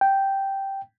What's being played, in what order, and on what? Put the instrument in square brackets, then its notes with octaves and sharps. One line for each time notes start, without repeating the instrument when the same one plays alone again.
[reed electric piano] G5